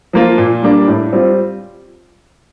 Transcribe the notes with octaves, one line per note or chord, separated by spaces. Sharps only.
F3 A#3 F4
A#2
G3 A#3 D4
A2
G3 C4 F4